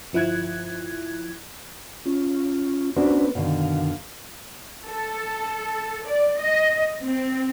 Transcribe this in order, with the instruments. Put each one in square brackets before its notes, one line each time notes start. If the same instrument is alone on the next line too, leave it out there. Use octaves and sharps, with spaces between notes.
[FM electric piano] G1 F3 E4 F#6 G#6
[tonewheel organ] C#4 F4
[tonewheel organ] B3 C#4 B4 [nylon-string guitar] D4 F#4 C5
[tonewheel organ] F#2 F5 [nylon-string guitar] B2 D3 D#3
[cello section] A4
D5
D#5
C4